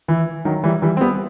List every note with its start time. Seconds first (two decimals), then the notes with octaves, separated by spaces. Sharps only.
0.08 E3
0.45 D#3 F#3
0.64 E3 G3
0.82 E3 G3
0.97 C4
1.00 G3 B3